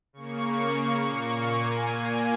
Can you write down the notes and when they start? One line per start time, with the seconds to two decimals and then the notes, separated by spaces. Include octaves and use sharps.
0.13 C#3 A#3 C#6
1.05 A#2 A#3
1.51 G#5
1.97 A#2 A#3